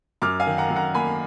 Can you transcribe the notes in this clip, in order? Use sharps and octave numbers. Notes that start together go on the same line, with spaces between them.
F#2 D6 F6
F5 G#5
D#3
F#5 A#5
F#2
F#5 A#5
A#3 G#5 B5